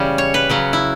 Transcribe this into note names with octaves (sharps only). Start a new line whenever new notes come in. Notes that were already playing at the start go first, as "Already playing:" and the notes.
Already playing: C#3 E3 G3 C#4
C#5
B4
C#3 F#3 C#4
E4